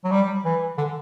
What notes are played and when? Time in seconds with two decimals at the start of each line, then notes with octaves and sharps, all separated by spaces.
0.05 F#3
0.11 G3
0.45 E3
0.78 D3